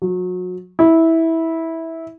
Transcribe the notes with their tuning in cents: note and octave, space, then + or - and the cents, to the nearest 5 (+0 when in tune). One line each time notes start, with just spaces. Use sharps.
F#3 -30
E4 -15